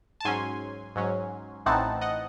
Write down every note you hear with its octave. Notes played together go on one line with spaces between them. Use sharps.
A5
G#2 F#3 C#4 G#5 C6
G#2 F#3 C#4
A1 A2 E3 C4 D#4 F#5 A5
D#5 F#5